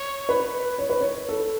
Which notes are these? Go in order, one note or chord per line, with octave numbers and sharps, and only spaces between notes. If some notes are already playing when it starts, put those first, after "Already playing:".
Already playing: C#5
B4
C#5
B4
C#5
A4